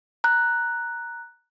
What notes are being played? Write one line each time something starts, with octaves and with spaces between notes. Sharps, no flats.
A#5 F#6